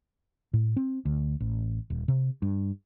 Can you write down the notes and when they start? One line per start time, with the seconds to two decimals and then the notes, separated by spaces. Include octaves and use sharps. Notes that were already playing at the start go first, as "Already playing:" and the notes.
0.53 A2
0.76 C4
1.05 D2
1.40 A1
1.90 D#1
2.08 C3
2.42 G2